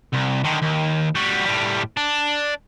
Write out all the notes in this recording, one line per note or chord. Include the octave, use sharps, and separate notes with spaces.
C2
D3 D#3
D#2
G3 F#4
A2 G3
D4